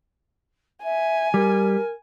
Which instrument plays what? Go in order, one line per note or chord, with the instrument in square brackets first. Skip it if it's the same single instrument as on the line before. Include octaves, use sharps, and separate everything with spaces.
[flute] E5 [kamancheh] G#5
[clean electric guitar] G3 [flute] A#4